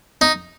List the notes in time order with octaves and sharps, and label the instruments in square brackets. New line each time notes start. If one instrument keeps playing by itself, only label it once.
[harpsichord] D#4